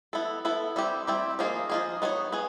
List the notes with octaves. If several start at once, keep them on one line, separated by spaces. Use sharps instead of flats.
B3 E4 A4
B3 E4 A4
G3 C4 E4 G4
G3 C4 E4 G4
F3 A#3 D#4 G#4
F3 A#3 D#4 G#4
B3 D#4 G#4 C#5
B3 G#4